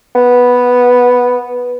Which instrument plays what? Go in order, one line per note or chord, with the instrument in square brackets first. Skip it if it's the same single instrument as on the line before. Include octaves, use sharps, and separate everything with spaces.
[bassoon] B3